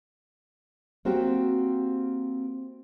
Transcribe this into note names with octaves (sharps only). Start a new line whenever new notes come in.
A#3 C4 F#4 G4